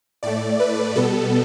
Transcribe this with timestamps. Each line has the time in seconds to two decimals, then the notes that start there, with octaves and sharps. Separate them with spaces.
0.23 A2 A3 D5
0.60 B4
0.96 B2 G3 B3 A4